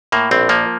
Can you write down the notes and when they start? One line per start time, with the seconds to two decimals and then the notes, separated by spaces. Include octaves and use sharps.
0.12 A2 A#3
0.31 A#1 C4
0.49 F3 A#3